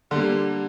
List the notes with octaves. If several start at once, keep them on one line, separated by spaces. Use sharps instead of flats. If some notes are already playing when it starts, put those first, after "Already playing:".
D3 G3 A#3